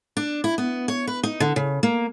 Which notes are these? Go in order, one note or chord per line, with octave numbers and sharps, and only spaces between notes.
D4
E4
B3
C#5
B4
D#4
D3
C#3
A#3